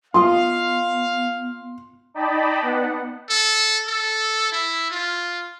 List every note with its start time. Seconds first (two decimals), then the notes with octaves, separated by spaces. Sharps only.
0.14 B3 F4 D#5 F5 C6
2.14 D#4 D5 D#5 G5 A5 B5
2.61 B3 F#5
3.30 A4
3.88 A4
4.52 E4
4.91 F4